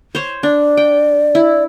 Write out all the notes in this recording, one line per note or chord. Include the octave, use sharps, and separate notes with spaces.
C5 C#5
D4 D5
G5
E4